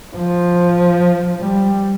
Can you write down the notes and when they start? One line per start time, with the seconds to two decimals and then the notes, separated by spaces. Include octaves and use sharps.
0.16 F3
1.40 G3